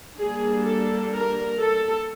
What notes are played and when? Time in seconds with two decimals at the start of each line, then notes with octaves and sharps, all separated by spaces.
0.18 G3 A#3 D4 G#4
0.65 A4
1.13 A#4
1.60 A4